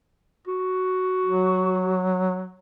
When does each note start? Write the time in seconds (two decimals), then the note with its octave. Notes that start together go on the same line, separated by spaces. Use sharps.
0.48 F#4
1.25 F#3